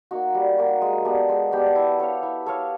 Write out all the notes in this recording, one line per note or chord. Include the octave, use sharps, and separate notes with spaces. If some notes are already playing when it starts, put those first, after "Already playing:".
A#3 D#4 F#4
G3
A#3 D#4 F#4
G#3
B3 D4 G4
G#3
B3 D4 G4
E4
A4 C#5 F5
E4
A4 C#5 F5